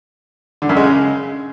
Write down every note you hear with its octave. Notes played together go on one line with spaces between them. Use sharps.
D3
F#2
G#3
C#3